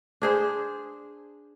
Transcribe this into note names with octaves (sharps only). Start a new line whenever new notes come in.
D4 G#4 C5